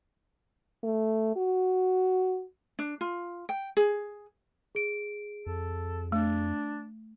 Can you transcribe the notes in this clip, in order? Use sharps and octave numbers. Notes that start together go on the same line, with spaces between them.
A3
F#4
D4
F4
G5
G#4
G#4 D7
F2 A4
A3 D4